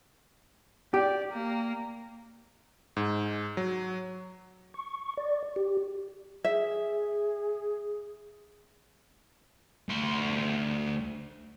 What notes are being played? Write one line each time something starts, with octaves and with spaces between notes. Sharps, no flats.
G4 D5
A#3
G#2
F#3
C#6
D5
G4
G#4 E5
D2 C6